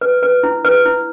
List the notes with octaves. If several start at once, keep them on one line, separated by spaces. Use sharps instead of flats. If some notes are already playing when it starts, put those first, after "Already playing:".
B4
B4
E4
B4
E4